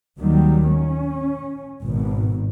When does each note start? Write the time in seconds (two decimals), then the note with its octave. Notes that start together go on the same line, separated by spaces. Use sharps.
0.19 D#2 D#3 F#3 G3
0.70 C#4
1.82 G#1 B2